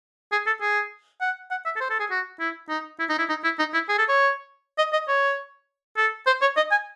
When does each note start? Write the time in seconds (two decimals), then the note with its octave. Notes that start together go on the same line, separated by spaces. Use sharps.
0.32 G#4
0.46 A4
0.61 G#4
1.21 F#5
1.51 F#5
1.65 E5
1.76 A4
1.80 C5
1.90 A4
2.00 G#4
2.11 F#4
2.40 E4
2.69 D#4
2.99 E4
3.09 D#4
3.19 E4
3.29 D#4
3.44 E4
3.59 D#4
3.73 E4
3.89 G#4
3.98 A4
4.09 C#5
4.78 D#5
4.93 D#5
5.08 C#5
5.97 A4
6.27 C5
6.41 C#5
6.57 D#5
6.71 G#5